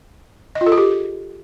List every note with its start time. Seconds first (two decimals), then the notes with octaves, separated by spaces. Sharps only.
0.55 D#5
0.61 F4
0.66 A4
0.72 G#4
0.78 G4